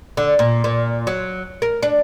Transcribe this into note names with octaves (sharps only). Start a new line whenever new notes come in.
D3
A#2
A#2
F#3
A#4
D4